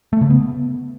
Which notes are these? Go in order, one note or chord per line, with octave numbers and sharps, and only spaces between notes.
A3
C#3
B3